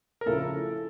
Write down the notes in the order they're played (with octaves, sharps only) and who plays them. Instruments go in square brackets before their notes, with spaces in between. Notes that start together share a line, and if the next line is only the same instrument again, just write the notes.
[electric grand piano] A#4
[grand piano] C#3 F3 A3 C#4 E4 [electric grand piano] A4